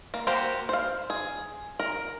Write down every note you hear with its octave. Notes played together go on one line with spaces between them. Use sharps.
A#3
A#3 F#4 G4 C5
C5 F5
G#4
A#4